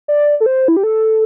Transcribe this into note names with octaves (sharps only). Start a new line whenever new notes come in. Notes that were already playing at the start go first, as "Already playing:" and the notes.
D5
A4
C5
E4
G4
A4